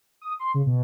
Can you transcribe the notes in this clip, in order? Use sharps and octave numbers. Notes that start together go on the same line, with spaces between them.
D#6
C6
C#3
B2